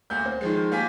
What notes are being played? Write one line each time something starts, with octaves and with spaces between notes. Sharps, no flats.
D2 A#3 G6
C4
D#3 F3 G#3
A#3 F4 G4 G#5 B6